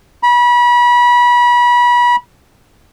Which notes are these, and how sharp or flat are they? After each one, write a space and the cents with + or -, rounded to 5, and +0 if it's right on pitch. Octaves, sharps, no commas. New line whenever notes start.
B5 -30